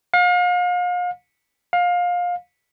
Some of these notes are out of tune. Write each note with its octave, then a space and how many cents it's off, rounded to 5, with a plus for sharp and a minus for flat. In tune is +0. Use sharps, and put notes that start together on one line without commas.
F5 +40
F5 +25